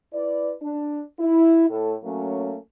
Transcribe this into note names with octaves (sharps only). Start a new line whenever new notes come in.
E4 B4 D5
D4
E4
A2 A4
F#3 A3 A#3 C#4